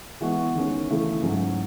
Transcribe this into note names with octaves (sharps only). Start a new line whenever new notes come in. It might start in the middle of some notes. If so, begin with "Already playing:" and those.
E3 G#3 B3 F#4
D#3 G#3 C#4
C#3 E3 A3 E4 G#4
G#2 F#3 C#4